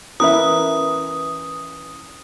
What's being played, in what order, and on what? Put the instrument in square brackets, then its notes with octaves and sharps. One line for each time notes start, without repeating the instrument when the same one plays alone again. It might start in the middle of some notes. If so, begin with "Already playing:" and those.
[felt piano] E3 C#4 [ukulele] A#4 B4 E5 [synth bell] D#6